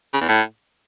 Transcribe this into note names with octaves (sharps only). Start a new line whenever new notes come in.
C#3
E2
A2